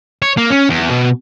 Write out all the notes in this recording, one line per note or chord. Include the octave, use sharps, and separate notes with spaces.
C#5
A#3
C#4
E2
B2